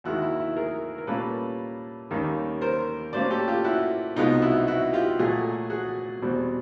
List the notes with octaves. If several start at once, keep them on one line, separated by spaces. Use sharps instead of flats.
D#2 D#3 G#3 E4 F#4
E4
E4
G#4 A#4
A#4
A#2 G3 A#3 C#4 A4 B4
D#2 D#3 G3 A#3 C#4
A#4 C5
A2 F#3 A#3 C#4 C5 D5
G4 A4
F4 G4
E4 F#4
C2 B2 G#3 B3 D#4 F4
E4 F#4
E4 F#4
F4 G4
A#2 F#3 A3 F#4 G#4
F#4 G#4
E2 B2 G3 C4